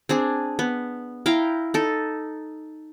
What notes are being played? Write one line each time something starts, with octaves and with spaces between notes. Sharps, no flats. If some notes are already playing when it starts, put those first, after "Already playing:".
C4 D4 G#4
B3
E4 F5 G5 A#5
D#4 A4